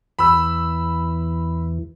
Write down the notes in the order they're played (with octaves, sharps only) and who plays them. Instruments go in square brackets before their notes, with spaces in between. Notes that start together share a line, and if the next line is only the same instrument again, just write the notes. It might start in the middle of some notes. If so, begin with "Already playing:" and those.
[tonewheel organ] E2 E3 [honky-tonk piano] B5 E6